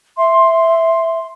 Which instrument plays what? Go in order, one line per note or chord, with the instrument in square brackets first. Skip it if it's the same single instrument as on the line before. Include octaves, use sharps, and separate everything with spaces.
[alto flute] E5 [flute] C6